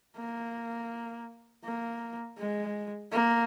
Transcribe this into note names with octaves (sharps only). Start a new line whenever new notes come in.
A#3
A#3
G#3
A#3